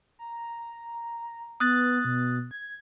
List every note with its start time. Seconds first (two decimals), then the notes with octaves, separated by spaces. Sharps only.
0.19 A#5
1.60 B3 D#6 F#6 A6
2.05 B2
2.51 G#6